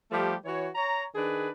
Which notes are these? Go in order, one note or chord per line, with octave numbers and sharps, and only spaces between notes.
F3 G3 A3 G4
E3 F#4 C#5
C#5 A#5
D#3 D4 G#4 B4